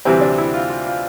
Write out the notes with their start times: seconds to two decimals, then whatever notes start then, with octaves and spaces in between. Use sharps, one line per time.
0.05 D2 C3 E3 G3 C4
0.21 D4
0.38 E4
0.53 F4
0.69 F4
0.87 F4